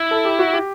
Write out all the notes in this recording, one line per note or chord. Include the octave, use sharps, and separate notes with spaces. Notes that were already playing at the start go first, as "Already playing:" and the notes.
Already playing: E4
A4
G4
F#4
G4